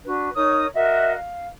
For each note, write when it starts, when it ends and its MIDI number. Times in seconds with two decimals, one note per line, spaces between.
0.04 0.29 62
0.04 0.29 66
0.04 0.29 71
0.34 0.66 63
0.34 0.66 70
0.34 0.66 73
0.34 0.66 87
0.74 1.14 66
0.74 1.14 70
0.74 1.14 75
0.74 1.14 76
1.14 1.47 77